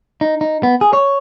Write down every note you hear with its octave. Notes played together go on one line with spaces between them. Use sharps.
D#4
D#4
B3
G#4
C#5